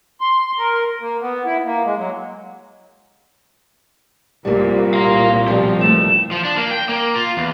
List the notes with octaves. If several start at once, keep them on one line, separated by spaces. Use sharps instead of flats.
C6
A#4
A#3
B3
E4
A#3
G#3
F#3
C2 A#2 G3 A#3
A#4 F5 C6
B2 F3 G3
D#2 A3 E7
F3
D4
A#3
G5
A#3
F4
E2